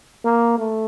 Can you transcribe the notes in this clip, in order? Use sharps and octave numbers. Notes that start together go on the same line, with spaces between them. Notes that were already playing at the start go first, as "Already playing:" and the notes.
A#3
A3